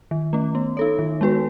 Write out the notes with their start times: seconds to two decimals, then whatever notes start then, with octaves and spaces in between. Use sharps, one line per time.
0.11 D#3
0.33 A3 C#4
0.55 B3
0.77 D#4 A4 C#5
0.99 D#3
1.21 G#3 B3 F#4 B4